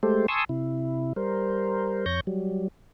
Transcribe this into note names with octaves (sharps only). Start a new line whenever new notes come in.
G#3 A3 G4 A4 C5
G#5 A5 C6 C#6 D#6 E6
C3 E4
G3 A#4 C5
F2 C#5 C#6 G6 A#6
F#3 G3